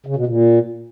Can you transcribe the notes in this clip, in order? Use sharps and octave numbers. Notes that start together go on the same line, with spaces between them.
C#3
B2
A#2